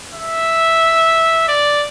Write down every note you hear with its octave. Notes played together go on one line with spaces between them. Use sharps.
E5
D5